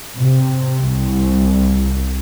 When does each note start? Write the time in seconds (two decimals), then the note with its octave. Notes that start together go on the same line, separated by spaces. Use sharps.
0.17 C3
0.86 C2